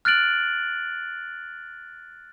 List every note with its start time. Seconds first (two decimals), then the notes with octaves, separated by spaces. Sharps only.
0.05 F6 F#6 A6 D7 F#7